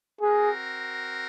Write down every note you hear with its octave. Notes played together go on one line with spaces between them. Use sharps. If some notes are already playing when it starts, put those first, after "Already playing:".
C4 F#4 G#4 A#4